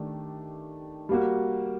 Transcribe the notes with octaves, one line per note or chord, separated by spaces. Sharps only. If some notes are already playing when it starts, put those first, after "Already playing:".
Already playing: D#3 A3 D4 G4
G3 A#3 F#4